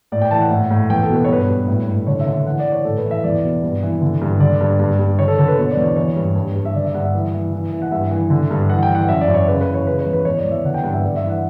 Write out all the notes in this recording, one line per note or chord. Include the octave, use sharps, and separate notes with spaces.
A2 D5
G5
E3 A5
F#5
A2
A2
E2 G5
A4
B2
B4
C#5
G2 B4
G2
A2
A2
D3 C#5
E5
D3
E5
E3 F#5
D5
E3
C#5
A2 A4
B4
E3
E5
E2 D5
B2
G2
E3
D3
G2
D3 D5
G2
G2
G2
D3 C#5
A4
D3 A4
B4
B2 C#5
D5
E2
C#5
E3 C#5
G2
G2
G2
E5
D3 D5
E5
G2 F#5
E5
E3
E3
E3
E3
F#5
G2 E5
E3
D3
G2
E3 F#5
G5
E3
F#5
F#2 E5
D5
F#2
C#5
C#3 B4
B4
E3
C#5
C#3 B4
C#5
E2
B4
E2 C#5
D5
E2
E5
D3 F#5
G5
G2 F#5
E5
G2 D5
E5
E3
F#5